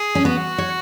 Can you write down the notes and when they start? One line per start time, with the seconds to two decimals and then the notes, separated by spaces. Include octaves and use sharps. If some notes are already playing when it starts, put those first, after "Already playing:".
Already playing: G#4
0.15 C#4
0.25 B3 F#4
0.58 C#5